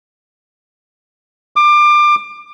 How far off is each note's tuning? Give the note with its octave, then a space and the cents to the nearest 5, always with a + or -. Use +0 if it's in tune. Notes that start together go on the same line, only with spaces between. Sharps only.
D6 +25